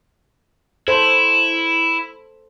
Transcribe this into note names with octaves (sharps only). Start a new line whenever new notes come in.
E4 A4 C5